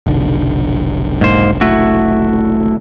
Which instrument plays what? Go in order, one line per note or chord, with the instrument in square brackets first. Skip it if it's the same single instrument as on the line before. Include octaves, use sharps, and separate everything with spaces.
[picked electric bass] F1 B1 D3
[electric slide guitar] G#2 A#3 C5
A3 E4 F#4